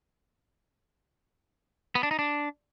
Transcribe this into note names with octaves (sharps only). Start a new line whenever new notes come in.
B3
D4
D#4
D4